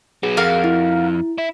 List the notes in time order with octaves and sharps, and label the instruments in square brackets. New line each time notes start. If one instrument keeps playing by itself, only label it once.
[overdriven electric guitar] F#3 B3 [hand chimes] G#4
[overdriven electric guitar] F2 [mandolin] F#4 A#4 F5
[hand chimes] E4
[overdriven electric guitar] E4 E5